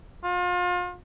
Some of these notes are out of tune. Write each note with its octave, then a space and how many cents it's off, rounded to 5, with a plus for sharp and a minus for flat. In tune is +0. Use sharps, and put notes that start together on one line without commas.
F4 +35